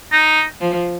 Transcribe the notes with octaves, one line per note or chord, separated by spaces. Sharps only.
D#4
F3